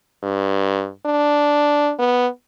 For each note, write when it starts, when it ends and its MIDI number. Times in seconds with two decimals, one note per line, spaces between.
0.23 0.89 43
1.06 1.92 62
1.99 2.27 59